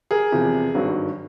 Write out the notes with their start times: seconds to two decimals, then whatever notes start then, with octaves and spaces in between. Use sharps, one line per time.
0.11 G#4 A#4
0.32 E2 C3 F3
0.74 G#1 G2 D#3 F#3